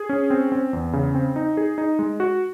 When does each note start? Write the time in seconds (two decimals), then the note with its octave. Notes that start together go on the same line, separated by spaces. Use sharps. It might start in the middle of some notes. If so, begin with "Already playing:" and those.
Already playing: G#4
0.09 C#4
0.30 C4
0.52 C4
0.73 E2
0.93 C#3
1.15 C4
1.36 D#4
1.57 G#4
1.78 D#4
1.99 G#3
2.20 F#4